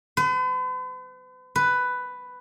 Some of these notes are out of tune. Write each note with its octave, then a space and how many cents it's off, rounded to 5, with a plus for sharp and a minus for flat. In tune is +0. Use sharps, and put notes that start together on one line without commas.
B4 +45
B4 +10